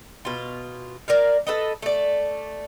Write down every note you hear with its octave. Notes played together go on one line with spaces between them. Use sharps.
B2 F4
A#4 D5 F5
A4 B4 D#5
A3 D5